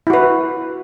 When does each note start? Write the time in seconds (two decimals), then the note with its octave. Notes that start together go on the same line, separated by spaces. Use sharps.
0.07 E4
0.10 F#4
0.13 B4